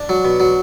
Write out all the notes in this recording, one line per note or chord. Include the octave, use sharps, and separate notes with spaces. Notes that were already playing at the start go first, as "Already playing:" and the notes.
Already playing: D4
F#3
B2
F#3